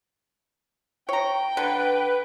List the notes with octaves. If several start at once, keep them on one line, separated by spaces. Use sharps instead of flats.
C#5 G5 A#5
D3 B4